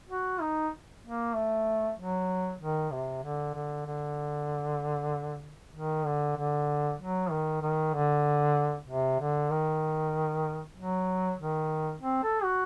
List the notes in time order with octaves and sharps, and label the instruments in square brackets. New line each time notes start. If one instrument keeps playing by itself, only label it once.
[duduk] F#4
D#4
A#3
A3
F#3
D#3
C3
D3
D3
D3
D#3
D3
D3
F#3
D#3
D#3
D3
C3
D3
D#3
F#3
D#3
C4
A4
F#4